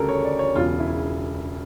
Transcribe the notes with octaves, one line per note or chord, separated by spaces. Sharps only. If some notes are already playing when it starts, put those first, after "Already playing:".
Already playing: D2 C#3 G3 A4 A#4
C#5
D5
C#5
E1 E2 C#3 F4
E4